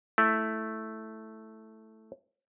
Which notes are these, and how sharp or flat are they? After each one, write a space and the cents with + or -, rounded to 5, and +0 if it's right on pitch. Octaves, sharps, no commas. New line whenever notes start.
A3 +0 E4 +0